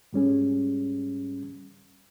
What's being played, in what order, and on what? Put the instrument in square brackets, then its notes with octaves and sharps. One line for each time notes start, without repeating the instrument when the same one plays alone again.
[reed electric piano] G#2 G3 C#4 G#4